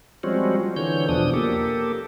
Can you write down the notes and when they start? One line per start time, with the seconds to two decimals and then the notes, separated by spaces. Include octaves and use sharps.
0.23 F3 G3 G#3 C4 C#4 F#4
0.76 D3 E3 C#5 G6
1.09 E2 B2 F3 D4 D#6
1.34 A#3 G4 A4